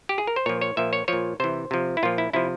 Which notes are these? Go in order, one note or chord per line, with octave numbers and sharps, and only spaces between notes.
G4
G#4
A#4
C5
A#2 F3 C#5
C#5
A#2 F3 E5
C#5
A#2 F3 C#5
C3 E3 C5
C3 F3
E4
A#2 F3 F4
E4
C3 F3 E4